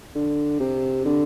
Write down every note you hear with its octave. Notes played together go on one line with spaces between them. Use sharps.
D3
C3
D3